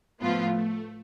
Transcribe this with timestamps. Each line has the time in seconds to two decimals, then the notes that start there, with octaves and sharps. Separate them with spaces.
0.21 A2 F3 A3 B3 F4
0.52 A3